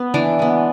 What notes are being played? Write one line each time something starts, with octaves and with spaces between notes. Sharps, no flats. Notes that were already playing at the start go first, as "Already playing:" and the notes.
Already playing: B3
E3 D4
G#3 B3